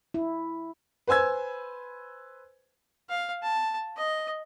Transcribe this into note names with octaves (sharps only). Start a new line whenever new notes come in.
E4
B4 C5 G#5 E6 G#6
F5
A5
D#5